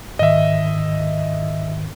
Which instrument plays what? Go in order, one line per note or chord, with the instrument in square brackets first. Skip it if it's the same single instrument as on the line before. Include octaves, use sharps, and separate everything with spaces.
[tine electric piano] G#2 D#3 [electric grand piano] D#5 E5